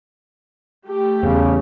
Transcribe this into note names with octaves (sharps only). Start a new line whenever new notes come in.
A3 G4
E2 C#3